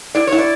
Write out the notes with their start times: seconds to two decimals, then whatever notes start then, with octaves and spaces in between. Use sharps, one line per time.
0.15 E4 D5
0.27 C#5
0.32 E4
0.39 D5